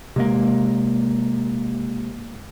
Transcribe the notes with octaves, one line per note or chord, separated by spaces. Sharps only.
C3 G#3 A#3